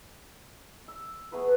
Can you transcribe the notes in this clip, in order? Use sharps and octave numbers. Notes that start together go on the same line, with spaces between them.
E6
A3 B3 G#4 B4